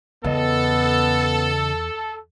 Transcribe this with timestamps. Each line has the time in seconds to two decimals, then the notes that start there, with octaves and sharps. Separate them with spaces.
0.24 E2 C#3 B3 A4 D#5